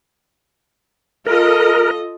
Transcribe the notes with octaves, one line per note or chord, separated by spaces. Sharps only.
F4 A4 A#4 D#5